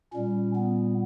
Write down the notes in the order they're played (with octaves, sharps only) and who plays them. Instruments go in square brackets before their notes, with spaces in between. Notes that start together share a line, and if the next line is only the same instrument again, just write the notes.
[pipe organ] A#2 G3 C#4
B3